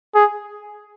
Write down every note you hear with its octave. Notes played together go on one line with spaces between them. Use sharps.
G#4